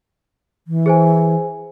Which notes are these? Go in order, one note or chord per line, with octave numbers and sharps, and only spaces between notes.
E3
G#4 C5 G#5